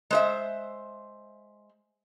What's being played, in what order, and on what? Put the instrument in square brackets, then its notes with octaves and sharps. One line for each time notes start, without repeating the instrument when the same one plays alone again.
[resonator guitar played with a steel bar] G#3 C5 E5